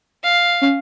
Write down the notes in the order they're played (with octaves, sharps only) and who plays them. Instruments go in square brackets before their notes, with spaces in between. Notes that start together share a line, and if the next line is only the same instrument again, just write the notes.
[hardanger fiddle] F5
[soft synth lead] C#4